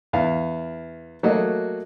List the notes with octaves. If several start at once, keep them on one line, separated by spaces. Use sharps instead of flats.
E2 F5
F#3 A3 A#3 F#4 D#5